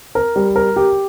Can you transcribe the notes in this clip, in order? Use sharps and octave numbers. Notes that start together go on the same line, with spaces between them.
A#4
G3
A#4
G4